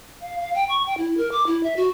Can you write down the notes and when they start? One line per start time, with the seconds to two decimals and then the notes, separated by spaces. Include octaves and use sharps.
0.21 F5
0.40 F5
0.55 G5
0.69 C#6
0.86 G5
0.98 E4
1.18 A#4
1.32 D6
1.47 E4
1.63 E5
1.77 F#4